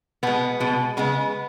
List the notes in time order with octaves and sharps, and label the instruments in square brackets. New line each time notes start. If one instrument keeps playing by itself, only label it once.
[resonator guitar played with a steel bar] B2 G#3 B3
B2 G#3
C#3 G#3 B3